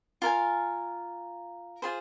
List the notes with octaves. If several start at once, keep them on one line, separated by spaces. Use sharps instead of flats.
F4 A#4 F5 G#5
F4 G#4 C5